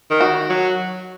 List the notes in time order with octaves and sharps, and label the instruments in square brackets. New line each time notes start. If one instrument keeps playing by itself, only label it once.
[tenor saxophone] D#3
[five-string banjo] F#4
[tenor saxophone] F#3